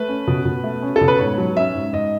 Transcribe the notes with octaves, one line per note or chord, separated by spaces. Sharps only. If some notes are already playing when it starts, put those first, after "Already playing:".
Already playing: A3 B4
C#4
B2
B2
A3
C#4
A4
B2
B4
G#2 C#5
F#3
C#4 E5
G#2
G#2 D#5